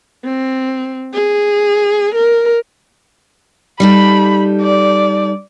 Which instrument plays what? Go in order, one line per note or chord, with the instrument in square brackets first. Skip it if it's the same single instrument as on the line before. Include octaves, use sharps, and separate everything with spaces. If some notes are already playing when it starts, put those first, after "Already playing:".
[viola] C4
G#4
A#4
[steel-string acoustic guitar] G3 D#4 A4 [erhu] B5
[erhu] D5